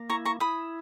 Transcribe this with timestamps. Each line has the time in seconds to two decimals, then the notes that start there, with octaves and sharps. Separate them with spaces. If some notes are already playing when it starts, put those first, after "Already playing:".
Already playing: A#3
0.10 E4 A#5 C#6
0.25 A#5 C#6
0.40 E4 B5 D#6